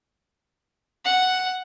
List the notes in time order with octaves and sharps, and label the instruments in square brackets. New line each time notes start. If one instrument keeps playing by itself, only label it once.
[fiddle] F#5